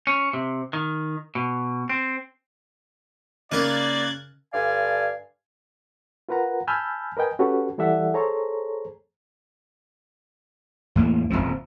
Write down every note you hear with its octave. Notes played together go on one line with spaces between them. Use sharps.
C#4
C3
D#3
B2
C4
C#3 A#3 D#4 A#4 D5 F#6 G#6 A6
G2 D3 D5 F5 G#5
F4 A#4 B4 F#5 A#5
G#5 A5 B5 E6 F6 G6
A#4 B4 D#5 G5 G#5
C#4 F#4 G4 A4 B4
E3 G3 A4 D5 E5 F#5
G#4 A4 C5 C#5 A#5
E2 A2 A#3
D#1 C2 F2 F3